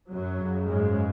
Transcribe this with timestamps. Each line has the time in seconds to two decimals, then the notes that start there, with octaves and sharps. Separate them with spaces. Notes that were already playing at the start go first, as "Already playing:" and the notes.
0.11 F#2 F#3
0.39 F#2 C#3
0.68 G#2 G#3